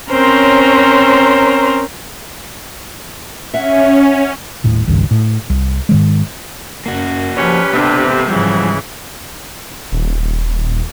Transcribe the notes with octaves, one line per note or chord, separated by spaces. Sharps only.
C4 C#4 A#4 C5 C#5 A#5
C#4 E5 F#5
D#1 A2
G#1 C#2 G2 D#3
A2
C2
G#2 D#3 G#3
F#2 A#3 F#4
A#2 F3 G3 C#4 G4 B4
C3 B3 C4 D4 A4
G#2 C#3 E3 F3 G3 F4
D#1